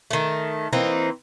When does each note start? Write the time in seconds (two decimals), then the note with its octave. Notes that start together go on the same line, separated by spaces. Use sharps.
0.11 D#3 A3
0.73 E3 A#3 C4 D#4